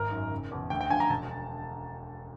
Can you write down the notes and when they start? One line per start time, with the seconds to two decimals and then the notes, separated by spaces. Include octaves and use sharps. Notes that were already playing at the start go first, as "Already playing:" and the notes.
Already playing: G#1 A#4
0.11 F#2 D#3
0.31 F#1
0.51 E2 B2
0.70 D2 G5
0.81 G5
0.90 D3 F3 G#5
1.00 A#5
1.10 E1 A5